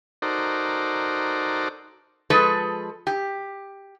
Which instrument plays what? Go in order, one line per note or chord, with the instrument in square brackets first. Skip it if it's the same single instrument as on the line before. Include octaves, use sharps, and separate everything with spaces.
[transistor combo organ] D#4 F#4 A4 A#4 C5 D5
[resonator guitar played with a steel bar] F3 G#3 G#4 A4 B4
G4